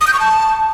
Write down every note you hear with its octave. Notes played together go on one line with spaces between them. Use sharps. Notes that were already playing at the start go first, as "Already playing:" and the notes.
D#6
G6
C#6
A5